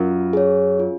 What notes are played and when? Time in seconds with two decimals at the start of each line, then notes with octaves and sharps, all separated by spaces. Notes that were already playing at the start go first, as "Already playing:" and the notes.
Already playing: F#2 F4
0.33 G#4 C#5
0.79 F4